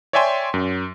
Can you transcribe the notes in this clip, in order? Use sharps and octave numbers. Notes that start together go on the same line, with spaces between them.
C#5 D5 E5 G5 G#5 C6
F#2